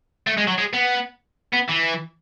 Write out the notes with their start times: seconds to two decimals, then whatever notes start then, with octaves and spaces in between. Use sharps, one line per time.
0.27 A3
0.38 G#3
0.48 F#3
0.58 G#3
0.73 B3
1.53 B3
1.69 E3